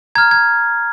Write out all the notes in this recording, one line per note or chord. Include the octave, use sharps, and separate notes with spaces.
A#5 F6 G#6
G#6